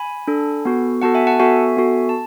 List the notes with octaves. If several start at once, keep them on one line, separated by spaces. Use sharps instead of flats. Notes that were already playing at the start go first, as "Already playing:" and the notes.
Already playing: G#5 B5
D4 A4
B3 F#4 A4
B3 F#4 A4 F#5 A5
E5 G#5
F#5 A5
B3 F#4 A4 E5 G#5
B3 F#4 A4
A5